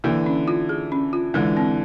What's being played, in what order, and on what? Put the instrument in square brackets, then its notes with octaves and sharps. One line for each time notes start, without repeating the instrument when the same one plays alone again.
[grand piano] D3 E3 [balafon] A#3
[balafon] C#4
F4
G#4
C#4
F4
[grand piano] D3 E3 [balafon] G#3
[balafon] C4